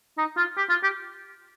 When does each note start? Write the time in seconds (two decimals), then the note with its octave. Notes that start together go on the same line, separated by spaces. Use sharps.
0.18 D#4
0.37 F4
0.57 G4
0.69 F4
0.83 G4